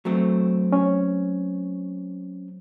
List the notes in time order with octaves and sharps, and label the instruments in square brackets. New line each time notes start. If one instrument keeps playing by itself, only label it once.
[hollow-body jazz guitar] F#3 A3 C4
[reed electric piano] C#4